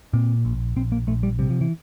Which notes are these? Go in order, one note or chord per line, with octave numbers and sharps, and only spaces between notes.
A#2 C4
A#1
A#1 C4
A#3
A#1 A3
G3
C3 G3
F3
E3